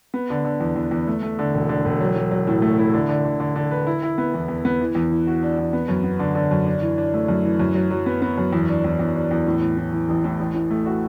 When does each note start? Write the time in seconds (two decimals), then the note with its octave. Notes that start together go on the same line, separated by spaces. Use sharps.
0.14 B3
0.30 D3
0.45 D3
0.60 E2
0.76 E2
0.91 E2
1.07 A3
1.23 A3
1.39 D3
1.54 E1
1.69 D3
1.85 E1
2.01 F#3
2.16 F#3
2.31 F#3
2.47 A2
2.62 A3
2.79 E4
2.94 D3
3.09 D3
3.25 D3
3.40 D3
3.56 D3
3.71 B4
3.87 E4
4.03 E4
4.18 B3
4.34 E2
4.48 E2
4.65 B3
4.80 E3
4.95 E2
5.11 E3
5.27 F#4
5.43 D4
5.58 E2
5.73 B3
5.88 F#2
6.04 B3
6.19 D3
6.35 D3
6.51 F#2
6.66 D4
6.82 E3
6.98 D4
7.14 A3
7.28 F#2
7.44 E3
7.60 F#2
7.75 F#3
7.91 F#3
8.06 B3
8.22 B3
8.38 F#2
8.53 E2
8.68 D4
8.84 E2
8.99 E2
9.15 D4
9.31 E2
9.47 A2
9.61 A2
9.77 A2
9.93 E3
10.09 A1
10.24 A2
10.40 A1
10.54 A2
10.70 A3
10.86 F#4